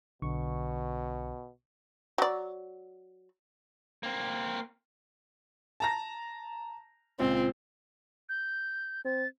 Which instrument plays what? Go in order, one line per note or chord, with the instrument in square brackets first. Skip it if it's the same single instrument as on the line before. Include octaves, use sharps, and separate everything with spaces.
[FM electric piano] B1 D3 C#6 [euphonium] B2
[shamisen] F#3 D5
[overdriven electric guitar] A#3 C4
[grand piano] A5 A#5 A#6
[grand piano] C#2 A#2 [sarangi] C4
[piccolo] G6
[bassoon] C4 [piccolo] A6